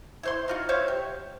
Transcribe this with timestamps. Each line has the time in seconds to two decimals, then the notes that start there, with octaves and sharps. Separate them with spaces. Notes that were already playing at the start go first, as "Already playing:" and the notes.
0.23 E4 C5 C6
0.48 D#4 F4 F#4
0.69 C5 C#5 E5 F5
0.88 G4